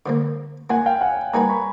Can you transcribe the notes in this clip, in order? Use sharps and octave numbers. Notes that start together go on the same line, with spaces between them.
D3 F3 A#3
A#3 D4 F4 F#5 G#5
F5 G5
F#5 G#5
G3 A#3 D#4 F#4 B4 G#5 A#5
B5 C#6